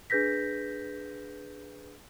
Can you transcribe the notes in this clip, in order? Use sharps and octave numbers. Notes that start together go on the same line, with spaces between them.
D4 G#4 B4 G6 A#6 B6